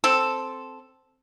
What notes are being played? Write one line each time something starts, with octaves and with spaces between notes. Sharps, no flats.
C4 A4